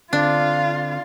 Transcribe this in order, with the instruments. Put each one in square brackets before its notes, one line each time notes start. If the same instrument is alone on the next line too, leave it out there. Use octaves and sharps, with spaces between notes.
[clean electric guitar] D3 C4 [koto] D4 [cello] F4